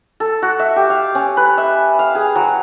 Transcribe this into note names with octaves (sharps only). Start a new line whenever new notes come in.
A4
F#4
E5
G4
F5
C#4
B4
E5
F5
G#4
F#3